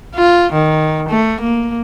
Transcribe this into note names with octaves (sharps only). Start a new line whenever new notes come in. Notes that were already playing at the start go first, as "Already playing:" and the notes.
F4
D#3
A3
A#3